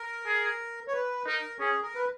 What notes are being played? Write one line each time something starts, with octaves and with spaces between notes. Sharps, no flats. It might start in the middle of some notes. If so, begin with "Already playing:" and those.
Already playing: A#4
G#4
C#5
B4
D#4 A#4
C#4 G#4
A#4
B4